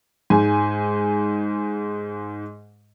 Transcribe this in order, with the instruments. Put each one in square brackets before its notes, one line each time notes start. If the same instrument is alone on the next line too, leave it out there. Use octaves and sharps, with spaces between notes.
[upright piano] G#2 G#5